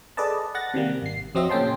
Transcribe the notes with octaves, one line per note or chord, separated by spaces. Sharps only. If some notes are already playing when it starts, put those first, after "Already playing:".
G#4 A4 B4 D5 D#5 A5
F#5 F#6 A6 A#6
C3 D#3 G3 A#3
G#1 C7
F2 F#3 C4 F#4 D#5 E5
A#2 C#3 C#4 G5 A5 C6